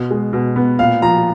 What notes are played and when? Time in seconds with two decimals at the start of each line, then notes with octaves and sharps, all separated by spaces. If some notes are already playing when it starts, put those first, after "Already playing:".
Already playing: B2
0.11 G#3
0.33 B2
0.56 B3
0.79 A#2 F5
1.02 F3 A#5